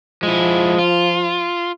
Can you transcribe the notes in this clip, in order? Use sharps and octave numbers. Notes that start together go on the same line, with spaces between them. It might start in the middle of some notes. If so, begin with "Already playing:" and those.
F3 G#3 E4
F4